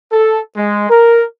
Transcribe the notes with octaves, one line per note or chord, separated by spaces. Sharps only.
A4
G#3
A#4